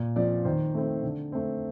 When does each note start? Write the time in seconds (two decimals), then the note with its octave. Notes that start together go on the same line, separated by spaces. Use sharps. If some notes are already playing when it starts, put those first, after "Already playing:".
Already playing: A#2
0.16 F3 C4 D5
0.44 D#3 C5
0.74 A3 C4
1.03 D3
1.32 A3 C4